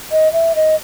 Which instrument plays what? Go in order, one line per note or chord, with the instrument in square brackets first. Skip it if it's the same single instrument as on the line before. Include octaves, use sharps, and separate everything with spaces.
[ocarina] D#5
E5
D#5